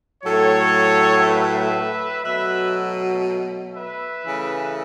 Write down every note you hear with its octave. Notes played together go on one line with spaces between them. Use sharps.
A2 F#3 A3 A4 C#5
B4 E5
B2 F#3 A3 B4 E5
B4 E5
C#3 E3 A3